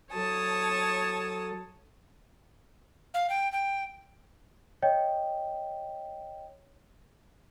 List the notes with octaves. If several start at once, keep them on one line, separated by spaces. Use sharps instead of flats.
F#3 A4 C#5 A5 D#6
F5
G5
G5
C#5 D#5 G5